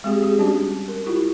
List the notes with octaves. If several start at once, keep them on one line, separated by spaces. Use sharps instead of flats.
G#3 C4 G4 G#4
G4 G#4
G3 C#4 D4 F#4 G4
A#4
E4 F4 G4